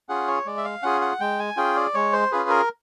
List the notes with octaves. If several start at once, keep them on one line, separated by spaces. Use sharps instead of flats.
C#4 F4 G#4 F#5
C#5
G#3 D5
E5
F5
C#4 F4 G#4 F#5
F#5
G#3 G5
G#5
C#4 F4 G#4 G5
D5
G#3 C#5
C5
C#4 F4 G#4 B4
A#4